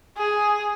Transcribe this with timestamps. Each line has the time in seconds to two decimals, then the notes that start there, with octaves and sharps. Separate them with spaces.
0.17 G#4